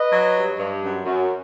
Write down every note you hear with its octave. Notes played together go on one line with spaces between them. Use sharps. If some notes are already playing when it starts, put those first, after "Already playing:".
Already playing: B4 D#5
F#3
G2
G2
F#2
F#2